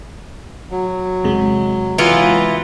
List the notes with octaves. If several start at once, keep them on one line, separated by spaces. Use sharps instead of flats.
F#3
E2 C3 G#3
E3 B3 F4